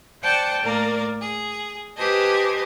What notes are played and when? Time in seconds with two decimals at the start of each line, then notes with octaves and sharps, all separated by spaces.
0.23 C5 D5 F#5 G5 A5
0.62 A2 A#3 A#4 D5
1.21 G#4
1.97 G4 B4 C5 D#5 G#5 A5